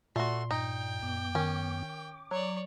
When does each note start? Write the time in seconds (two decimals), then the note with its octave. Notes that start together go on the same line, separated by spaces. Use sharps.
0.16 A#2 A3 F#4 C6
0.51 G2 D#4 G5
1.03 F#2 B3 D6
1.35 D#3 C#4
1.88 D6
2.31 F#3 C#5 D5